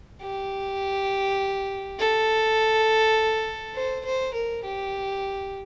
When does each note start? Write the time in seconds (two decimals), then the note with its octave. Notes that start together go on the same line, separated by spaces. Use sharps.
0.22 G4
1.99 A4
3.75 C5
4.05 C5
4.34 A#4
4.64 G4